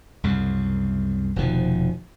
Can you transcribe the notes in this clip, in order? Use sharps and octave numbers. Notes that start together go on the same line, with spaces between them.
C2 F#2 C#3
F1 B2 D#3 F3